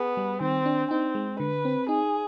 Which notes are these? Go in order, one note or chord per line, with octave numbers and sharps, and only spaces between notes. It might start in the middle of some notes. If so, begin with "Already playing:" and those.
Already playing: B3 G#4
G3
D#3 C4
D4
C4 D#4
G#3
D3 B4
C4
D#4 G#4